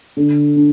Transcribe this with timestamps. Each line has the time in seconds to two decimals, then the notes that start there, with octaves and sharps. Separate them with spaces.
0.17 D3
0.56 D4